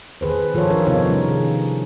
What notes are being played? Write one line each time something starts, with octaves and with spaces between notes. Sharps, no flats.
D#3 G#4 B4 C5
D#3 F3 F4 A4 C5 C#5
F3 D4 F4 A#4
C3 B3 D#4 A#4 C#5 F5
D#3 G3 C#4
G#4